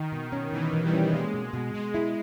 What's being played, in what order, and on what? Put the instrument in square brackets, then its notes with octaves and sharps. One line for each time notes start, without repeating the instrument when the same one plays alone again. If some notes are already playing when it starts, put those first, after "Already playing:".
Already playing: [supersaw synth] D#3
[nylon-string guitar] B2
C#4
[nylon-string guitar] B2 [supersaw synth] E3
[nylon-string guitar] B2
[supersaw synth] G3
[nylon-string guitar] C#4
[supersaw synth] G#3 [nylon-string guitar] A#3
[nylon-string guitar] B2
B2
[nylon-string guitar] B2 [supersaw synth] G#3
[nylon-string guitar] E4